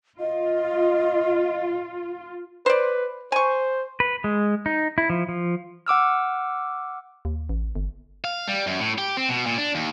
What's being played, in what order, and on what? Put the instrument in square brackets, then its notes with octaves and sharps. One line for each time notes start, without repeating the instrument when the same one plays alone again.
[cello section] F4 [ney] D#5
[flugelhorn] B4 [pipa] C5 D5
[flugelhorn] C5 [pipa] G#5 C#6
[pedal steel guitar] B4
G#3
D#4
E4
F3
F3
[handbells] F#5 D6 E6 F6
[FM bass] D#2
A1
G1
[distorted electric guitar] F5
G3
F#2
A2
G4
C4
B2
A#2
D4
D#2